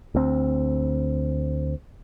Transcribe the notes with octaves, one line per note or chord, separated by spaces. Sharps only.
D2 C4